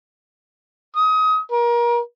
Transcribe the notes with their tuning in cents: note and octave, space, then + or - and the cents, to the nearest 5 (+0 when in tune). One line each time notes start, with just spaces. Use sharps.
D#6 +25
A#4 +30